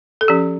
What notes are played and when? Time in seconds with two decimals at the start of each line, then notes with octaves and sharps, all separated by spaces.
0.21 A4
0.28 F3 C#4 G4